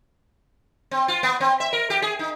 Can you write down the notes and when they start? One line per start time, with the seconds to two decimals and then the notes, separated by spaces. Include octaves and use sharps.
0.91 C4
1.08 F4
1.23 B3
1.40 C4
1.60 E5
1.73 A#4
1.90 G4
2.02 G#4
2.19 D#4